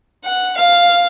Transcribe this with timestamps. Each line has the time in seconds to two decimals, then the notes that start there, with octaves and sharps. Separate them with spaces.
0.25 F#5
0.57 F5